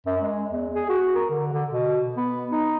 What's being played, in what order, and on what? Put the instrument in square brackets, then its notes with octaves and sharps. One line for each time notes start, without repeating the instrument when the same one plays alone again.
[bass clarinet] F#2
G#3
E2
G#4
F#4
A#4
D3
D3
B2
B3
D#4